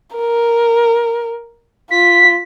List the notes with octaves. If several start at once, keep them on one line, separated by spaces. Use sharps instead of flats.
A#4
F4 B6